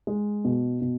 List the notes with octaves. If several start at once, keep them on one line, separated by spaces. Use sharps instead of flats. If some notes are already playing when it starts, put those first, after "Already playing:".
G#3
B2
B2